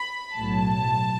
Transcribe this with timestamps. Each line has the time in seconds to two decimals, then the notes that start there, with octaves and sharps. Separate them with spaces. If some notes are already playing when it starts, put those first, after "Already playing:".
Already playing: B5
0.34 B1 A2 F#3 A5